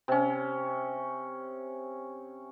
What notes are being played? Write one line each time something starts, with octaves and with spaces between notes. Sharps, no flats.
C3 C#4